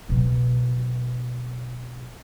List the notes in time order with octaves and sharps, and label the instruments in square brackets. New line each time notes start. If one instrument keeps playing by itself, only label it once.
[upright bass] B2 F#3